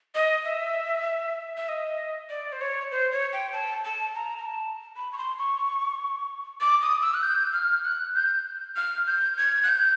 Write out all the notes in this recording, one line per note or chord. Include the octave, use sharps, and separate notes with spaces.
D#5
E5
E5
D#5
D5
C5
C#5
C5
C#5
G5
A5
A5
A#5
A#5
A5
B5
C#6
C6
C#6
D6
D#6
E6
F#6
G6
F6
F#6
G6
F6
G6
G#6
F#6
G6